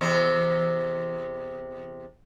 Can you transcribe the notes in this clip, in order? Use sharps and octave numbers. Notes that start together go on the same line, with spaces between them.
E2 C3 C4